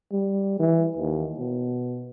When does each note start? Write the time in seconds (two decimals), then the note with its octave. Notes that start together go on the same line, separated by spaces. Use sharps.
0.12 G3
0.60 E3
0.97 D#2
1.39 B2